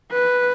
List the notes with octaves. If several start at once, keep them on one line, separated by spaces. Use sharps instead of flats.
B4